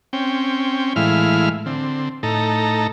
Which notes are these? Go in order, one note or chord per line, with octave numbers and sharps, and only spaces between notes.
C4 C#4 G5
A2 E3 G#3 E4 F5 F6
D3 C4
A2 D#4 A4 A#5